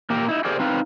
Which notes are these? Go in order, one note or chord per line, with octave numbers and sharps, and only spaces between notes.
A#2 A#3 G4 A#4
D#4 E4
G4 G#4 A#4 C5 D5
C4 D#4 B4 F5